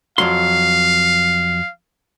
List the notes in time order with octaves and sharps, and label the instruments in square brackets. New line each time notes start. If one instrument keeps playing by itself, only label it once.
[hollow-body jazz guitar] F2 F#3 C6 [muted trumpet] F5